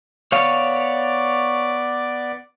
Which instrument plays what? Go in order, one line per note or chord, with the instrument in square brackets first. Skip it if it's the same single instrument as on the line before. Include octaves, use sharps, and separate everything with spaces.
[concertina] B3 D5 D6 [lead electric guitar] C#5 F5